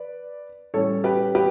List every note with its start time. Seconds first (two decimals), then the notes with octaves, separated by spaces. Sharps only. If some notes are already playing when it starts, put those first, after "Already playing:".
Already playing: B4 D5
0.74 A2 G3 C#4 A4 C#5
1.04 G4 B4
1.35 G4 B4